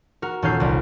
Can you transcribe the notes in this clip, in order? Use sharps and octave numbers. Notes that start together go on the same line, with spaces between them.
F#4 A#4
D#1 C#4 A4 F5 G6 C7
C2 G3